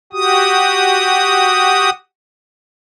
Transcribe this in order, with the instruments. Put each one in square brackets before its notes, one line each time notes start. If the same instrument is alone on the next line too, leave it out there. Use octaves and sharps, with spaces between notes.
[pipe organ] F#4 G4 D#6